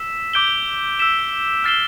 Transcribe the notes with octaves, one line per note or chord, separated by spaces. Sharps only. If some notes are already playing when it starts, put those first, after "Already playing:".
Already playing: E6 B6 E7
D6 G6 D7 G7
E6 B6 E7
F6 A6 C7 E7 G7